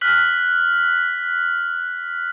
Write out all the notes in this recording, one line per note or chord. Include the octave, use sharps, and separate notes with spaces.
F6 F#6 B6 F#7